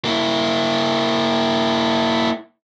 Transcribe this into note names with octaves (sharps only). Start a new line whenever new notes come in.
A#3 E4